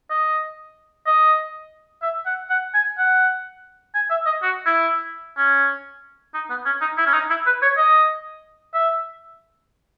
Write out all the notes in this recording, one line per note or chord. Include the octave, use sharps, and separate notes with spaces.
D#5
D#5
E5
F#5
F#5
G#5
F#5
G#5
E5
D#5
F#4
E4
C#4
D#4
B3
C#4
D#4
E4
C#4
D#4
E4
B4
C#5
D#5
E5